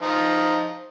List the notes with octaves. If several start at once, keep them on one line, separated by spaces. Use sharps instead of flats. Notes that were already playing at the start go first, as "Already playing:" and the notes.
F3 D#4